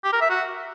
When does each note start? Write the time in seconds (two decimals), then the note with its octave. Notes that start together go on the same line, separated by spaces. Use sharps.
0.04 G4
0.13 A#4
0.21 E5
0.30 F#4